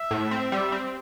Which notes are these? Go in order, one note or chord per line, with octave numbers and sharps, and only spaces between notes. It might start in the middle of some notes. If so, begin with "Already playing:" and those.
Already playing: E5
A2
C4
G3
C4